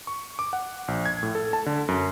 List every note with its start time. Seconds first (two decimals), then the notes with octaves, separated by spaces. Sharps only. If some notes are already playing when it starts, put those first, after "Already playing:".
0.07 C#6
0.39 D6
0.53 F#5
0.88 A#1
1.06 G#6
1.23 A2
1.35 A4
1.53 A5
1.66 D3
1.88 F#2